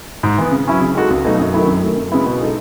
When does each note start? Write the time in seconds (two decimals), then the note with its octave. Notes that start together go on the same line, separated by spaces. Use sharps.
0.23 G#2
0.38 E3 B3
0.52 C#3
0.67 F#3 C#4 E4
0.81 C#3
0.95 G#3 D#4 F#4 A4
1.10 C#2
1.24 B2 F#3 A3 D#4
1.39 F#2
1.54 D#3 F#3 A3 E4
1.67 F#2
1.82 D#3 A3
1.96 F#2
2.12 C#3 G#3 B3 E4
2.26 B2
2.40 G#3 D#4 A4